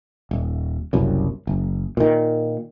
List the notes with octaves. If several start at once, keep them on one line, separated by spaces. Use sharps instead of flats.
D#1
F#1 C2 F#2
F#1
A#2 D#3